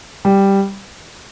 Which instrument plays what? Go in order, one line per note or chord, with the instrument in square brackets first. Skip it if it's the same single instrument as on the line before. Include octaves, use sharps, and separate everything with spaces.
[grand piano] G3